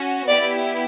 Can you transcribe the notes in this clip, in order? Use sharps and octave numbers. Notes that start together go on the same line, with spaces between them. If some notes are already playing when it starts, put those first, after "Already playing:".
Already playing: C#4 F#4
B3 E4 G4 D5